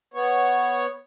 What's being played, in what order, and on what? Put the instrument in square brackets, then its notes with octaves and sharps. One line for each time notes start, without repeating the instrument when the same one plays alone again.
[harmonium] B3 C#5